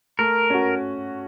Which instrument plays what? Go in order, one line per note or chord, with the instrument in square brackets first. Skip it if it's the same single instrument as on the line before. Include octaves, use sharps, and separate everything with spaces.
[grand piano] A3 [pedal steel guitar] A#4
[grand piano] C#4 F#4